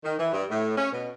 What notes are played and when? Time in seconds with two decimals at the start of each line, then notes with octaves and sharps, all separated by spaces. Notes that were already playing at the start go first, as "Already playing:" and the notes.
0.04 D#3
0.19 E3
0.33 G2
0.50 A2
0.78 C#4
0.92 B2